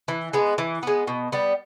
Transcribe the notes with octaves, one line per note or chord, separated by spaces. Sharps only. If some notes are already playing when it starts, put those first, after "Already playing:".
E3
G#3 B3
E3
G#3 B3
B2
G3 B3